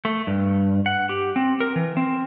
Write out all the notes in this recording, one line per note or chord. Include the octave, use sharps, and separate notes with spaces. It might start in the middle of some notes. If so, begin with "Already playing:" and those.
A3
G2
F#5
G4
C4
A#4
E3
C4